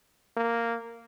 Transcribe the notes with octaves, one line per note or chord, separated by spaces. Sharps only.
A#3